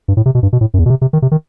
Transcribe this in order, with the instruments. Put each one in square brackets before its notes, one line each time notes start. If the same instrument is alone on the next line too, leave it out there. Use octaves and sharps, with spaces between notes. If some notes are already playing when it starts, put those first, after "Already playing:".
[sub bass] G2
A2
C3
B2
G2
B2
A2
F#2
E2
B2
C3
C3
D#3
C3
D#3